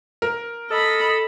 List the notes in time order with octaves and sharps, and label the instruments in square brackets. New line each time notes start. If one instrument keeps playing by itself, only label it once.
[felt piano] A#4
[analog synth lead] A4 [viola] D#5 B5